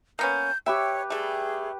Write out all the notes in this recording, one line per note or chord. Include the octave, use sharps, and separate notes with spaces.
A#3 B3 C#4 G6
G4 B4 C#5 E5 G5
G3 A3 G#4